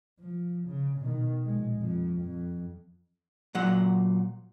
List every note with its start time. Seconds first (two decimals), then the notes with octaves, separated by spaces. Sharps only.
0.20 F3
0.68 C#3
0.99 B2 D#3
1.45 A#1 G#3
1.78 F2 F3
2.21 F2
3.55 A#2 F#3 F#5